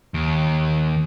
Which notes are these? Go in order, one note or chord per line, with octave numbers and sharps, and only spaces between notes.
D#2